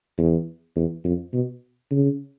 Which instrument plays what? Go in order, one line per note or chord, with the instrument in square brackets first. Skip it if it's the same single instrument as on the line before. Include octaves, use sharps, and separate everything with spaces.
[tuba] E2
E2
F2
B2
C#3